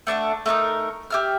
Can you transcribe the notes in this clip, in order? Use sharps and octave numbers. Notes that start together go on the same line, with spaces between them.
A3 D4 E5 F#5
A3 D#4 A#4 D#6
G4 E5 F6